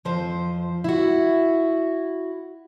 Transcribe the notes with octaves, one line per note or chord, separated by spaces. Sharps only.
F2 F3 C5
E4 F#4